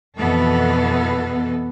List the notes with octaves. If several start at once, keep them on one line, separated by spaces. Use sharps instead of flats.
F2 B2 E3 B3 A4